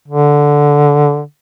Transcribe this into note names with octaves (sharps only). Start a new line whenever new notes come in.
D3